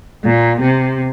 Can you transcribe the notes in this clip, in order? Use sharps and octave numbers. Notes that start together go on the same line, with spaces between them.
A#2
C3